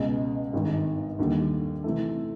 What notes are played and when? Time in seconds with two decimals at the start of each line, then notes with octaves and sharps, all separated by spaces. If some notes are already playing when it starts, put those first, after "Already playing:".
Already playing: C#2 B2 G#3
0.53 G#1 G2 D#3
1.19 D#2 D3 G3
1.84 C3 E3 A3